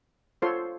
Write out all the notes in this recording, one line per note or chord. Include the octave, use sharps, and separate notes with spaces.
F4 A4 C5 C#5 C6